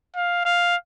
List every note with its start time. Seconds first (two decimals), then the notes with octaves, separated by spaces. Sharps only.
0.16 F5
0.45 F5